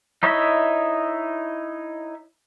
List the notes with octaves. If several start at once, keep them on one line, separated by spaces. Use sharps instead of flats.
D#4 E4 C#5 D#5 E5